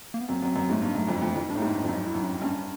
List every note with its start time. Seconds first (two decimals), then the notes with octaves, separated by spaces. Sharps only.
0.14 A#3
0.21 B3
0.29 F#2 C4
0.42 F#2
0.56 F#2
0.69 G#2
0.72 A3
0.82 G2 A#3
0.95 F#2 A3
1.09 F2 G#3
1.22 F2 A3
1.35 F2 E4
1.43 D#4
1.49 G2 D4
1.55 A2
1.58 G#2 D#4
1.75 G2
1.83 F2
1.88 F#2 D#4
2.06 E4
2.15 F#2
2.24 C#4
2.41 G2 C#4